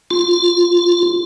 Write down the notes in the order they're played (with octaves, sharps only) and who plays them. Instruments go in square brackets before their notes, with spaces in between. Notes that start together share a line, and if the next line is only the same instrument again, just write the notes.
[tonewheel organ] F4